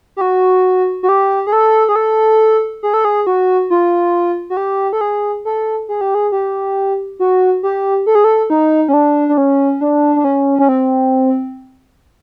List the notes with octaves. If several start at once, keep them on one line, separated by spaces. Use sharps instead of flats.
G4
F#4
F#4
G4
G#4
A4
G#4
A4
G#4
A4
G#4
F#4
F4
F#4
G4
A4
G#4
A4
G#4
G4
G#4
G4
F#4
G4
A4
G#4
A4
D#4
C#4
D4
D4
C#4
D4
D4
C#4
C#4
C4